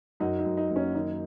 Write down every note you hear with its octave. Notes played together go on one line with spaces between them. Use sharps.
F#2 D#4 F#4
D#4
F#2
D#4
F#1
C#4
D#3 D#4